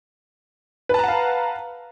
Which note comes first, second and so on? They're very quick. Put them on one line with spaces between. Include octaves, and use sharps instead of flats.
B4 A5 A#5 F#5 F5